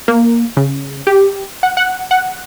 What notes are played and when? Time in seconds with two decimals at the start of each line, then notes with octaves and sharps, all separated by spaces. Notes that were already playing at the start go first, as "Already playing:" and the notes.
0.08 A#3
0.57 C#3
1.07 G4
1.63 F#5
1.77 F#5
2.11 F#5